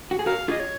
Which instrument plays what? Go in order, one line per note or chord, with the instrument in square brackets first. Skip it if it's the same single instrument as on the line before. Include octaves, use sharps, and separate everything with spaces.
[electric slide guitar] F#4
G#4
[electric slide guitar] F#4 A#4 [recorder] F5
[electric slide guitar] F4 G#4 [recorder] D#5
[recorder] C#5